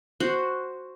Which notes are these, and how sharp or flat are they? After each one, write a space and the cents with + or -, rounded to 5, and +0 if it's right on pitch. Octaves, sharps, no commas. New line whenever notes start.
F#4 +0 C5 +0